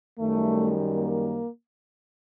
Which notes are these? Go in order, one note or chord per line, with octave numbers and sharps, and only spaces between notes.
F#2 D#3 G3 A3
A#3